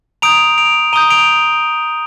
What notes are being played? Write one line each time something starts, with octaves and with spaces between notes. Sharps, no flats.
A#5 D#6 G6 D7 F7
D7 F7
A#5 D#6 G6 D#7 G7
D7 F7